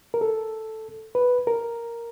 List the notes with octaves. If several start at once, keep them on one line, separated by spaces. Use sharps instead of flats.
A#4
A4
B4
A#4